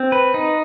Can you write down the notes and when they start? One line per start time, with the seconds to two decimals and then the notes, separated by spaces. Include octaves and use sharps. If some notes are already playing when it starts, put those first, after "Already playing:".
Already playing: C4
0.12 B4
0.34 D#4